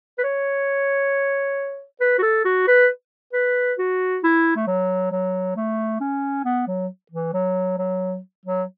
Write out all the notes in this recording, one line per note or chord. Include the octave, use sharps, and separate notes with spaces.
B4
C#5
B4
F#4
A4
F#4
B4
B4
F#4
E4
A3
F#3
F#3
A3
C#4
B3
F#3
E3
F#3
F#3
F#3